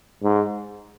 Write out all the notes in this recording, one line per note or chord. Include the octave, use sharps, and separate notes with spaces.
G#2